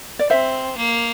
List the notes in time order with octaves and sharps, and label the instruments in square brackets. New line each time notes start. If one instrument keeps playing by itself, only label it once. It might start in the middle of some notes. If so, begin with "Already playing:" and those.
[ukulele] D5
[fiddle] C4 [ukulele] C5 E5
[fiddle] A#3